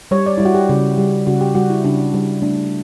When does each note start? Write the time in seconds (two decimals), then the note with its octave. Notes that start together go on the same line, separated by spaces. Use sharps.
0.11 G3 C#5
0.26 D5
0.38 G3 E4
0.45 F#4
0.55 G4
0.69 C#3
0.98 G3
1.27 C#3 F#4
1.41 G4
1.55 G3 F#4
1.70 E4
1.84 C#3 D4
2.14 G3
2.42 A3 D4